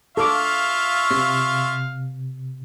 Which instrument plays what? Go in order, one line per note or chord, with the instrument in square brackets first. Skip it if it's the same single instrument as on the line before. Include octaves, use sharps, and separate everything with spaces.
[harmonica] F4 E5 C#6 [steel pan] A4 D6 [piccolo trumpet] F5
[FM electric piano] C3